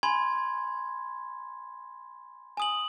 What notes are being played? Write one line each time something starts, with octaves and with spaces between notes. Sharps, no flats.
G#5 B5 C6 G#6
G#5 D#6 F#7